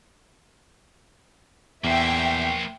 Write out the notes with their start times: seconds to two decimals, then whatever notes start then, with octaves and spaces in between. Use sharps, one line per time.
1.84 E2 A#3 C5 E5 G5